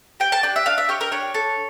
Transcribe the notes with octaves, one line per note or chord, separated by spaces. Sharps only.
G4 G5
A5
D4 G5
E5
D4 F5
E5
G4 C#5
A#4
D4 C#5
A4